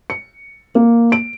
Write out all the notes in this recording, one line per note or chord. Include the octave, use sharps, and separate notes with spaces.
C#7
A#3
D7